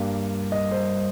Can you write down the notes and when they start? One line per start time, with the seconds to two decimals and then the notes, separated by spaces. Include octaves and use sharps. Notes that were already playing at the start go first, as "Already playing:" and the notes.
Already playing: G2 G3 A#3
0.52 D#5
0.71 C5